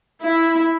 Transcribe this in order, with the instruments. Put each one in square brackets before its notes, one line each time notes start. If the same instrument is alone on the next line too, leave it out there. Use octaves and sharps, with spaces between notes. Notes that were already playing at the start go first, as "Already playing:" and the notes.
[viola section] E4